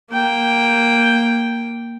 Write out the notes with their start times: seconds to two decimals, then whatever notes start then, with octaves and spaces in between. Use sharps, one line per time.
0.13 A#3 G5